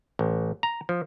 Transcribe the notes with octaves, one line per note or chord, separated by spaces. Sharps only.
A1
A#5
F3